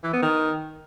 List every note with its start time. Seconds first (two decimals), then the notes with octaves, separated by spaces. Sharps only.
0.04 E3
0.13 B3
0.22 D#3